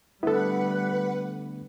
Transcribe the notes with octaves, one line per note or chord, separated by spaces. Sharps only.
D3 G3 A3 B3 E4 A4 B4 F#5